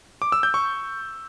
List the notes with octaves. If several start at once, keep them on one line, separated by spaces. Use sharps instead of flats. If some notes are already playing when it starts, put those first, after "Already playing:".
D6
E6
G6
C#6